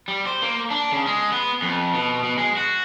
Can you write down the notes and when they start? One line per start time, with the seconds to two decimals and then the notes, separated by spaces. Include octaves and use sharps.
0.08 G3
0.27 C5
0.42 A#3
0.71 D4
0.93 C#3
1.06 G#3
1.32 B3
1.62 F2
1.93 B2
2.23 B2
2.37 G#3
2.57 F#4